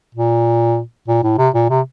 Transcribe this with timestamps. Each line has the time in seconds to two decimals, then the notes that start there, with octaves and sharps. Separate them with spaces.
0.15 A#2
1.08 A#2
1.23 A2
1.38 C3
1.54 A#2
1.70 C3